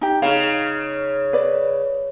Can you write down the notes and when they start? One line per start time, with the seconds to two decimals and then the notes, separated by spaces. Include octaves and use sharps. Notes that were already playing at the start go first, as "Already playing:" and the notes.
0.01 D#4 G4
0.22 C#3 D#4 F5
1.33 B4 D5